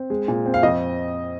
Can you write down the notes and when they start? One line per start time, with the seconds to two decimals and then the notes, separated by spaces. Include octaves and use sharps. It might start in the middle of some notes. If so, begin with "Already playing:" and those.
Already playing: C4
0.10 G#3
0.28 A#2
0.46 C4
0.54 F5
0.63 F2 D#5